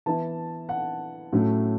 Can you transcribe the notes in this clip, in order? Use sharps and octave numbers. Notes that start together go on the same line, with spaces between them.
E3 B3 E4 A5
F#5
A2 F#3 A3 C#4